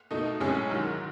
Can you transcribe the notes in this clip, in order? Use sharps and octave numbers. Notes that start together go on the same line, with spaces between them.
B2 A3 D#4
B1 A2 G#3 C#4 G#4
G#2 D#3 F#3